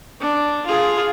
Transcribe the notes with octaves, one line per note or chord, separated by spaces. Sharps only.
D4
F4 G#4